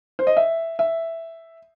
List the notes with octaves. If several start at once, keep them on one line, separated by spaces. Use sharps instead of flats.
C5
D#5
E5
E5